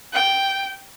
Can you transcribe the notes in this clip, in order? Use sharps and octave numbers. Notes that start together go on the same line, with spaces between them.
G5